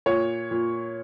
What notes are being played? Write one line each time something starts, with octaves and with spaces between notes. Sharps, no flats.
A#2 C#5
A#2